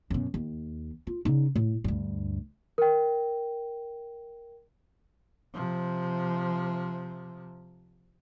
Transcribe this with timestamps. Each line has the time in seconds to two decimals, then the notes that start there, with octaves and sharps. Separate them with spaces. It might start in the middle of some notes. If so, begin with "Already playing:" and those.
0.10 F#2 B2
0.34 D#2
1.07 F4
1.25 C#3 D#4
1.55 A2
1.84 D2 G2
2.78 A#4 G5
5.54 C3 F3